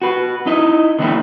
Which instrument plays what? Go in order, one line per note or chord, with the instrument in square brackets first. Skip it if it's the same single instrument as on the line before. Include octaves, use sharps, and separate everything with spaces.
[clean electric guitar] F#4 B4
D#4 E4 D#5
D3 D#3 A#3 B3 D#4 E4